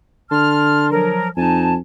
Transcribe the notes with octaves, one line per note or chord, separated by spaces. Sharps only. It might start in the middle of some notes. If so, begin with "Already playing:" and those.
D3 A5 C6 F6
F3 F#3 A#4
F2 D#4 G#5 A5